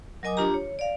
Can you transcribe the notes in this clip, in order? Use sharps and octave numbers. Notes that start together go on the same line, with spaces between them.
F#3 A#4 D#5 G#5 D6 D#6
D4 F4 G4 A#5
C#5
D5 F5